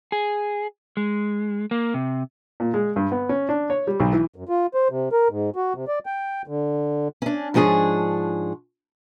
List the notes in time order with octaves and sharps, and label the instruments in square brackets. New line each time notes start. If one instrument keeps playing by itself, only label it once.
[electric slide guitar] G#4
G#3
A#3
C3
[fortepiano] A#2
G#3
G2
B3
C#4
D4
C#5
G3
B1
E3
[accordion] F#2
F4
C5
C3
A#4
G#2
F#4
C3
D5
G5
D3
[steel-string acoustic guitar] C#4 D4
G#2 F3 D4 G#4 C#5